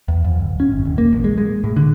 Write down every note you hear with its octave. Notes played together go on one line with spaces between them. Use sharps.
E2
F2
D1
C#4
G1
D#1
A#3
A1
G#3
G#3
A2
D3